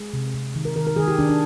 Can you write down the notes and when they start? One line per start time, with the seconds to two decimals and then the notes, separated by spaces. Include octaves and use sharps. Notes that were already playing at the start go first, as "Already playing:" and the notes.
Already playing: G#3 G#4
0.13 C3
0.34 C3
0.55 D#3
0.65 A#4
0.76 D#3 A#4
0.87 A#4
0.96 D#3 G#4
1.08 G4
1.18 D#3 D4
1.29 D4